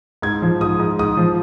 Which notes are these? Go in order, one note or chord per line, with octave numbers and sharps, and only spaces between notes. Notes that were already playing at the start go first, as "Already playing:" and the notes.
G#2 G#6
F3
G#2 D#6
G#2
G#2 D#6
F3